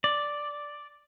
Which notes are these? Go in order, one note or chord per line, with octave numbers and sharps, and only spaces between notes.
D5